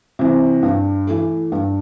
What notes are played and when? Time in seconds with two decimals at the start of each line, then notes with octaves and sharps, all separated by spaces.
0.19 C3 E3
0.63 G2
1.07 E3 A3
1.52 G2